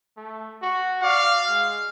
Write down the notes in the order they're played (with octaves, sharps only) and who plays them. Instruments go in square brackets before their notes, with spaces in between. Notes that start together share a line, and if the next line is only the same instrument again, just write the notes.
[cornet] A3
F#4
[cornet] D5 [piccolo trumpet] F5
[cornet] G#3